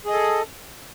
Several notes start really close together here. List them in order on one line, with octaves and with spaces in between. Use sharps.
G#4 D#5 A4